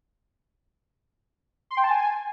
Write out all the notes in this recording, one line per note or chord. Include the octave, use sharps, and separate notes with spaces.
C6
G5
A5
G#5